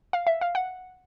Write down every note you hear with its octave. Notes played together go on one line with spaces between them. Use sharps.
F5
E5
F5
F#5